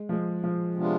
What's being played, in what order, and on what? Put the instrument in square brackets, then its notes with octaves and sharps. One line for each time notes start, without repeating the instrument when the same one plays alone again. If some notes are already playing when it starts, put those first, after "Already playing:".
Already playing: [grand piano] G#3
F3
G#3
F3
[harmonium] C3 G#3 B3 D4 F4